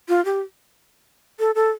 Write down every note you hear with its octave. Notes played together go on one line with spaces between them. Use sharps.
F4
G4
A4
A4